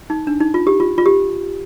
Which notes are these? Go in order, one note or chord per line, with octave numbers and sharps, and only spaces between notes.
D#4
D4
D#4
F4
G4
F4
F4
G4